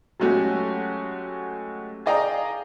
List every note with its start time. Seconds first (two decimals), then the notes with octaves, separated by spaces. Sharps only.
0.20 F#3 G#3 A3 C#4 F#4 G4
2.06 G#4 D5 D#5 F5 G5 A#5